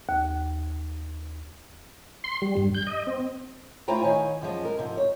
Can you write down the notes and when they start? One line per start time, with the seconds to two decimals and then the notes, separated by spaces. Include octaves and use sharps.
0.09 D#2
2.24 C6
2.42 G3
2.57 G2
2.74 G6
2.87 D#5
3.07 C4
3.88 A3 E4 F4 C5 G5 A#5
4.01 D#3 C#5 F5 G#5
4.41 F#2 F3 G#3 A5
4.65 A#4
4.78 G#2 C3 F3
4.97 C#5